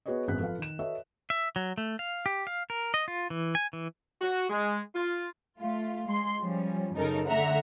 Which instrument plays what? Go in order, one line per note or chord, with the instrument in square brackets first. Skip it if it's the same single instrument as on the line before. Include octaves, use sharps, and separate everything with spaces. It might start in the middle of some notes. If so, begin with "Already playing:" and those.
[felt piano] B3 F#4 G#4 B4 C#5 D#5
G#1 F#2 B3 G#4 F#6 B6
F3 A4 B4 F5
D#3 E7
F#4 A4 B4 C#5 D#5 E5
[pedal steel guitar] E5
F#3
A3
F5
G4
F5
A#4
D#5
F4
E3
G#5
E3
[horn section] F#4
G#3
F4
[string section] A3 F4
G#3 C6
F3 G3 C#4
F#2 C#3 D#4 A4 A#4
D3 A3 E5 F#5 A#5